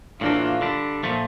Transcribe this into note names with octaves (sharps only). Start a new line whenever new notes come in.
A2 E3 A#3 D4 F4
D3 G3 D4
A#2 F3 A3